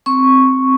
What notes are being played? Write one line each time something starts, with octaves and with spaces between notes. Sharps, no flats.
C4 C#6